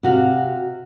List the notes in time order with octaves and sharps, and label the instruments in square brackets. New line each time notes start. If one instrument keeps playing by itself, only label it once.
[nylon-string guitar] C3 F#4 F5